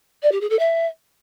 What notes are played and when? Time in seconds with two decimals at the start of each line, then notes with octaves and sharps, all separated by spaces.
0.23 D5
0.32 G4
0.41 G#4
0.50 A4
0.59 E5